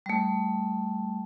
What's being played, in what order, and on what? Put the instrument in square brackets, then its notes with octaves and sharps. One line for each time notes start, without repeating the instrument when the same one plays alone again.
[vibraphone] G3 A3